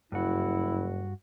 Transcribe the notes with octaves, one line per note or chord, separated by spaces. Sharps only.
F#1 G2 E4 F#4